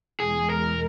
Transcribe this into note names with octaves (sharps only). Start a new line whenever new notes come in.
E2 B2 G#3 G#4
A#4